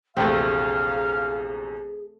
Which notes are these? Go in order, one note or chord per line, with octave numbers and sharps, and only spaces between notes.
A#1 E2 C3 A3 C4 G#4 F5